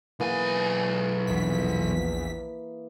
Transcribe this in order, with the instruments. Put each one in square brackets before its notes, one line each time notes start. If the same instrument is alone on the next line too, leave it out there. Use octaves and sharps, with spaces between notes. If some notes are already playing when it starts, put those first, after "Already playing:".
[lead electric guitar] B1 G#5 [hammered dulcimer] E3 A#3 G#4
[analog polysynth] A#1 E2 B6